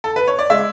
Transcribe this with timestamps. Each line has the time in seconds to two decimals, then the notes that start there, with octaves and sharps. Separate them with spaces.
0.04 A4
0.16 B4
0.27 C#5
0.39 D5
0.50 G#3 E5